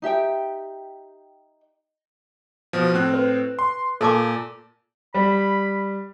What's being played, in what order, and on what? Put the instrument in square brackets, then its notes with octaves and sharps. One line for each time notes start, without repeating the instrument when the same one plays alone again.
[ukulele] D#4 G4 E5 G5
[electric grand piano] B2 F3
A2 C4 F#6
[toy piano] B4
[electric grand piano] C6
[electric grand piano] A#2 [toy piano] A4 A5 D6
[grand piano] G3 [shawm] B5